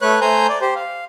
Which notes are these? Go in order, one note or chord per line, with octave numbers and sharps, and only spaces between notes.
A3 B4 C#5 F#6
A3 C5 G#5 A#5 G6
D5
G4 C5
F5